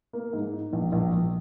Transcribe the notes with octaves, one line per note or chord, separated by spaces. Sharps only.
A#3
G#2
D#4
A#1
A#1
A#1